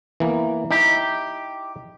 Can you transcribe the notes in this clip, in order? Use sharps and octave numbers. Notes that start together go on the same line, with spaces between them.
E3 A#3 B3
D#4 E4 G4